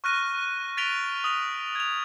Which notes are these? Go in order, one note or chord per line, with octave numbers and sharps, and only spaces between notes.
C#6 F6 F#6 A#6 D#7
A6 B6 D7 F7 G7
D#6 F7
G#6 F7